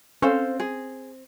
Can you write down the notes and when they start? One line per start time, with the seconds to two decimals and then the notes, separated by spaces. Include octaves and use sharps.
0.22 C4 C#4 A4 C5 F5
0.60 G#4